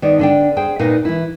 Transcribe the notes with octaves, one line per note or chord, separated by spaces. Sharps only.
D#3 B3 D5
D3 D4 G5
G#4 C5 G5
A#2 D#4 B4 D#5 F5
E3 E4